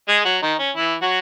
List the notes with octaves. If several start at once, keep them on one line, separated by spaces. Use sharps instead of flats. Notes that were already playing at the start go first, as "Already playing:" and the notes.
G#3 G#4
F#3 F#4
D#3 D#4
C#4
E3 E4
F#3 F#4